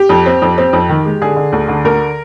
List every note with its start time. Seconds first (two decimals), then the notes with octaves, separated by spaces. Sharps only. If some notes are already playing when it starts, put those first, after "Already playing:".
Already playing: G4
0.09 F2
0.26 C4
0.42 F2
0.58 C4
0.73 F2
0.89 D#3
1.05 G#3
1.22 D3 G#4
1.36 D3
1.52 D2
1.68 D3
1.84 D2 A#4